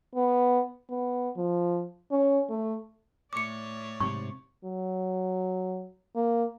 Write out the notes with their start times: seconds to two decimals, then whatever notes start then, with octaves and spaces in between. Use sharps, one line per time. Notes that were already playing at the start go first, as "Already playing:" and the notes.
0.15 B3
0.90 B3
1.37 F3
2.11 C#4
2.50 A3
3.33 A2 C#5 D5 D6 C#7
4.00 G#2 C3 C#6
4.64 F#3
6.15 A#3